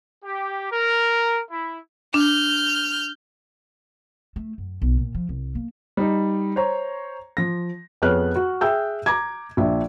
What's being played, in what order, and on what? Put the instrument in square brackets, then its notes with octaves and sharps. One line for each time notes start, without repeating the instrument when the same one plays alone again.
[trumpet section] G4
A#4
E4
[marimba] D4 [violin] F6 G6
[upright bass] A3
F#2
B1
A#2
F3
C2
A#3
[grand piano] G3 D#4
C5 C#5 A#5 C#6
F3 A#6
[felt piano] F2 B3 G#4 C#5 F6 F#6
F#4
G#4 E5 G5 E6 G6
A#5 D6 G#6
A#1 D4 E5